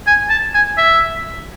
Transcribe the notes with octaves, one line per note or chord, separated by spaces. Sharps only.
G#5
A5
G#5
E5